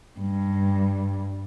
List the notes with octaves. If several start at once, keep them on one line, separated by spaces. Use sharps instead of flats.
G2